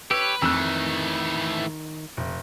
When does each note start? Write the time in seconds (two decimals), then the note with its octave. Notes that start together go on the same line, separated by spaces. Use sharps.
0.11 G4 B4 C#5 E6
0.42 F2 D#3 E3 A3 E6 F#6
2.17 F1